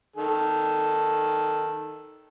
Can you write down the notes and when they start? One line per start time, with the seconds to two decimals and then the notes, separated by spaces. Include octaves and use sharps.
0.16 D#3 A4